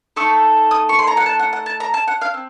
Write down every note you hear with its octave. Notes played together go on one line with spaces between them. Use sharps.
A3 D#4 A4 C#6
D#6
C#6
C6
A#5
F#5
A5
F#5
F#5
A5
A#5
A5
F#5
F5
C4